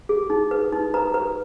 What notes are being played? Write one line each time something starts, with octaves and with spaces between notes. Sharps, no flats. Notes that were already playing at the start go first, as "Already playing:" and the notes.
G#4
D#4
B4
D#4
B4 A#5
B4